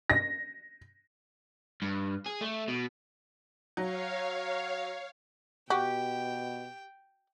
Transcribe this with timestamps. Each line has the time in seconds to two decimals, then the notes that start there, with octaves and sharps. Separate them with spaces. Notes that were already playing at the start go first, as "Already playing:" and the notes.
0.10 A#6
1.82 G2
2.26 G#4
2.41 A3
2.68 B2
3.77 F#3 C#5 F5
5.70 B2 F#4 G4 G5